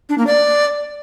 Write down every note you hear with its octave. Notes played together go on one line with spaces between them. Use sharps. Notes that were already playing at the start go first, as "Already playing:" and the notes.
D4
A#3
D5